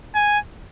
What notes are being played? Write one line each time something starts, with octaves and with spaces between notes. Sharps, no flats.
G#5